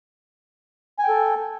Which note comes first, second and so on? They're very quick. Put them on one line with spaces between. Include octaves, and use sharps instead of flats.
G#5 G5 A4